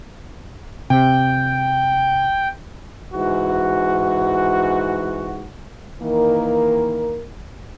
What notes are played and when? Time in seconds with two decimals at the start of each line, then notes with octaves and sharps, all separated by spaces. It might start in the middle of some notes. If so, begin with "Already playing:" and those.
0.90 C3 G5
3.14 G#2 E3 F#4
6.01 D#3 E3 A#3 A#4